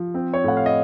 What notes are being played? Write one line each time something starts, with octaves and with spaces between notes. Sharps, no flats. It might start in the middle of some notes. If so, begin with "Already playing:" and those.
Already playing: F3
C4
C#5
A2 F#5
F5
D#5